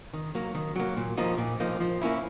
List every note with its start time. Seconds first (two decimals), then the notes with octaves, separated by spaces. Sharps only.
0.13 D#3
0.35 F#3 A#3
0.55 D#3
0.76 F#3 A#3
0.96 A#2
1.17 F3 A#3 D#4
1.38 A#2
1.60 F3 A#3 D#4
1.80 F3
2.01 A#3 C#4 E4